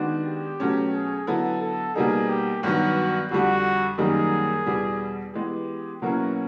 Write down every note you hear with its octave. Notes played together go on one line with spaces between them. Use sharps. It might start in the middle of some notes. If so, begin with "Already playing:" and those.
Already playing: D#3 G#3 B3 D4 F#4
G4
B2 F#3 A3 C#4
G#4
D3 F#3 B3 E4 A4
A4
B2 G3 A#3 D#4 G#4
G4
G2 D#3 F#3 B3 F#4
F2 D3 G3 F#4
F#2 D#3 G3 A#3 D#4 G#4
E2 B2 G3
E3 G#3 B3 G4
B2 F#3 A#3 C#4 E4 F#4